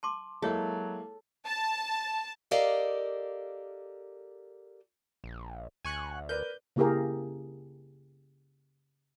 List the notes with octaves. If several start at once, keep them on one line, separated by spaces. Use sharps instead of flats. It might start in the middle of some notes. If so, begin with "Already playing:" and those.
A5 C6 D6
F#3 G#3 A#3 E4 G#4 A4 C#5
A5
G4 A4 A#4 D5 D#5 F5
A#1
D2 G#5 C#6 F#6
A#4 B4 D5 G6
C#3 A#3 E4 G4 G#4 A#4